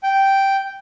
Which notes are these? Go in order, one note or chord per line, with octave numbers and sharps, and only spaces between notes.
G5